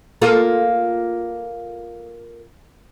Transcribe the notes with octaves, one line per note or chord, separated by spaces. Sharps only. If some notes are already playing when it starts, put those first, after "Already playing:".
A#3 F4 A4